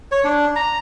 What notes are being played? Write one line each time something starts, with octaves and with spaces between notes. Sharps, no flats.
C#5
D4
A#5